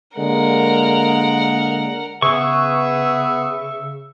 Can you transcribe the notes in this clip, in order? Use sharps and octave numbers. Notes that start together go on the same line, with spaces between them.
D3 G#3 A#3 A#4 F#5
C#3 B3 G#4 B4 E5 C#6